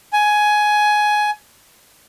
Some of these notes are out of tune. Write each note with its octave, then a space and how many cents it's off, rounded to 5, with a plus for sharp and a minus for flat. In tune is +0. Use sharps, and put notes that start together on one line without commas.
G#5 +15